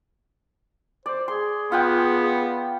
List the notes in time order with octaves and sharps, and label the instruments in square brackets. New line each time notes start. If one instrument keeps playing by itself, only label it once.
[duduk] C5 [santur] D5
[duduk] G#4 [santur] C6
[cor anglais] B3 [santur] F4 F#5 G5